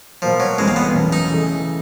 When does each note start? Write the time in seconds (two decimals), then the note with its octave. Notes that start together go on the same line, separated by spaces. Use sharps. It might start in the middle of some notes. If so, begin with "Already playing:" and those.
0.22 B2 F3 F#3 A#3
0.40 F#3
0.58 G1 G2 E3 G3 G#3 C4
0.68 A#3
0.76 B3
0.94 E2 B2 F#3 A3 C#4
1.13 D#4
1.30 C#3 E3 A3